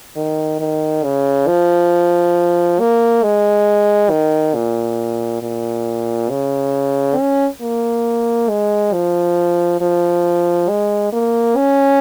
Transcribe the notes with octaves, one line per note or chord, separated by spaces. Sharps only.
D#3
D#3
C#3
F3
A#3
G#3
D#3
A#2
A#2
C#3
C#4
A#3
G#3
F3
F3
G#3
A#3
C#4